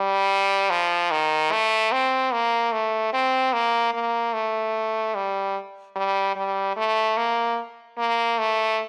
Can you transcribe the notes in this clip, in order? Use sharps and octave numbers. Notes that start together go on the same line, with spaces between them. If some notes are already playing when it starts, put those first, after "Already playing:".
Already playing: G3
F3
D#3
A3
C4
A#3
A3
C4
A#3
A#3
A3
G3
G3
G3
A3
A#3
A#3
A3